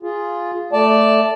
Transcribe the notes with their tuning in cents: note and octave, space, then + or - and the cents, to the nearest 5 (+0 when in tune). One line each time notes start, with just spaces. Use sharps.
F4 +0 G#4 +0
A3 +0 D5 +0 A5 +0